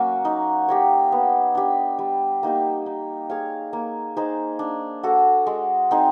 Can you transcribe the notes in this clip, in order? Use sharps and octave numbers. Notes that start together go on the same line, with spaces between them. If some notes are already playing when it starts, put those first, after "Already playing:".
Already playing: F#3 A#3 C#4 F#4
D#4
G4 A#4 C#5
B3
D4 G4
G3
A#3 D#4 G4
D#4
G#4 C#5 F5
A#3
D#4 G#4 C5
D4
F#4 A4
G#3
C4 D#4 G#4